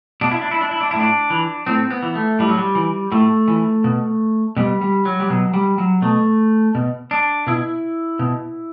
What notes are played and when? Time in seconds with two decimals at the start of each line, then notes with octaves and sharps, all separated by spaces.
0.21 B2 D4
0.31 E4
0.41 D4
0.51 E4
0.61 D4
0.71 E4
0.81 D4
0.91 A2 E4
1.00 D4
1.30 E3
1.66 A2 C4
1.91 B3
2.03 E3
2.15 A3
2.39 A2 G3
2.49 F#3
2.57 G3
2.75 E3
3.12 A2 A3
3.48 E3
3.84 B2
4.56 B2 G3
4.81 G3
5.05 F#3
5.20 G3
5.30 B2 F#3
5.54 G3
5.78 F#3
6.02 B2 A3
6.75 B2
7.11 D4
7.47 B2 E4
8.19 B2